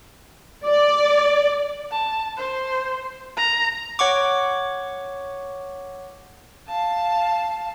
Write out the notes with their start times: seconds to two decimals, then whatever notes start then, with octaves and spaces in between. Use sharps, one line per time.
0.66 D5
1.92 A5
2.37 C5
3.37 A#5
3.99 C#5 F#5 C#6 D6
6.68 F5 A5